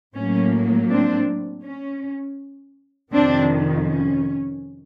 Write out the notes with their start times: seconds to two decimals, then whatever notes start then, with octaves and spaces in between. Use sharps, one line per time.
0.15 A2 F#3 A#3 C#4
0.89 C4 D4
1.63 C#4
3.12 F2 C3 D#3 C4 D4
3.87 C#4